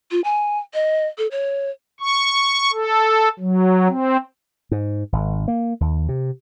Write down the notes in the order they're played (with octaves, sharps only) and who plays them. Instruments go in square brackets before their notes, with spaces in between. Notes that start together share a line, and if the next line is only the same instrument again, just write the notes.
[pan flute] F4
G#5
D#5
A4
C#5
[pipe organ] C#6
A4
F#3
C4
[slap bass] G#2
G#1
A#3
D#2
C3